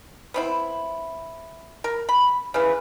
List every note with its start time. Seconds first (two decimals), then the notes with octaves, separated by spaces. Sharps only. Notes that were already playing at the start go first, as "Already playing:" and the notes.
0.34 B3 C4 E4
1.84 A#4
2.09 B5
2.54 C#3 E3 B4